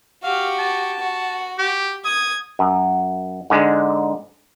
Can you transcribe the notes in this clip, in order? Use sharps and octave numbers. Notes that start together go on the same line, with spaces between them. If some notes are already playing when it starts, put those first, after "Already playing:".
F#4 G4 F5
A5
F#4
G4
D#6 G#6
F#2
G#2 D3 G#3